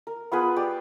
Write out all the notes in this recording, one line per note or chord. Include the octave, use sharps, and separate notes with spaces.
A#4
B3 F4 G#4 B4
G4 D5